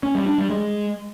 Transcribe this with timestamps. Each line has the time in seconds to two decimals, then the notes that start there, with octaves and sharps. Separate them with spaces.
0.03 C#4
0.15 G3
0.26 D4
0.38 G3
0.50 G#3